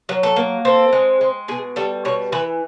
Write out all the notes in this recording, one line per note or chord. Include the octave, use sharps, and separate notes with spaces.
F#3
A4
A#3
C4 A4
G#3
G#3
B2 G#4
G3 A4
B2 C#5
E3 B4